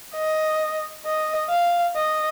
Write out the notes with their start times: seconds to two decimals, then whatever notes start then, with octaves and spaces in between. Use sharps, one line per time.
0.15 D#5
1.05 D#5
1.50 F5
1.96 D#5